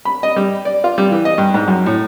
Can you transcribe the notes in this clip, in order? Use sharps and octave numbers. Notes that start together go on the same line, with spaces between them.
B5
D#5
G3
D5
F4
G3
E3
D#5
G2
G#2
F#2
A2